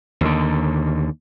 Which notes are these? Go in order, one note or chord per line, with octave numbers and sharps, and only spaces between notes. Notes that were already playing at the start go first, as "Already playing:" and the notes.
D#2 D3